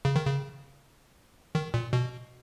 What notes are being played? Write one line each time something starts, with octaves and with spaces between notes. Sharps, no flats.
C#3
D#3
C#3
D#3
A#2
B2